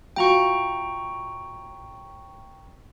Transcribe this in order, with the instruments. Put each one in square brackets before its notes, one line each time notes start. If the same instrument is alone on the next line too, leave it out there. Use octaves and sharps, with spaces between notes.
[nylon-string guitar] A2 F4 F#4 [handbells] G5 A#5 C#6